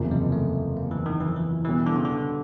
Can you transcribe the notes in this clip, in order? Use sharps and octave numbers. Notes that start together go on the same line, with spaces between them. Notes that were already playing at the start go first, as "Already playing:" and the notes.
Already playing: F#1 E2 C3 F3 A#3
G#3
A3
A#3
E3
D#3
E3
F3
E3
B2 E3 G3 B3
D3
C#3
D3